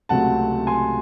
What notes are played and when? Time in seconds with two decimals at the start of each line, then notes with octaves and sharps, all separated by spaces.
0.09 C#2 C3 F#3 A3 C4 F#5 A5
0.67 G#5 C6